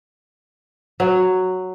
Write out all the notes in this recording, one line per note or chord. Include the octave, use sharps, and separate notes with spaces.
F#3